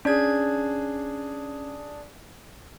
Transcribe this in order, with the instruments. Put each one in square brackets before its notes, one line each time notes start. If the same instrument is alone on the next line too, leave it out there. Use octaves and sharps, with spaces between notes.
[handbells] C#4 G#6 [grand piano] D4 G#4